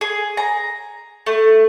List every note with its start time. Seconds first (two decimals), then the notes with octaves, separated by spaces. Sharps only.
0.01 G#4
0.37 A#5
1.26 A3